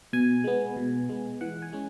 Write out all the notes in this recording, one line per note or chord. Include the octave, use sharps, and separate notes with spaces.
B2 G#5
G#3 B3
B2
G#3 B3
E3 F#5
G#5
G#3 C#4